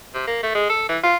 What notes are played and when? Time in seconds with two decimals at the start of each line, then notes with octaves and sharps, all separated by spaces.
0.15 C3
0.27 A#3
0.43 A3
0.55 G#3
0.70 A4
0.89 E3
1.04 F4